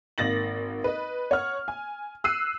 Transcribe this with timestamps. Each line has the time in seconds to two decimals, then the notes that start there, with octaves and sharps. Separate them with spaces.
0.18 G#1 A#3 A6 A#6 F#7
0.84 B4 D#5
1.31 C#5 F#5 F6
1.68 G#5
2.24 E6 F#6 C7 D#7